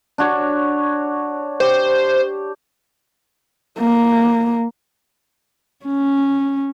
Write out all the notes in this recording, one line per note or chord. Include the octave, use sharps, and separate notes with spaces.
D4 F#4 C#5
G4 C5
A#3
C#4